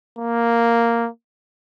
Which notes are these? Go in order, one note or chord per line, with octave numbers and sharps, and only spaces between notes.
A#3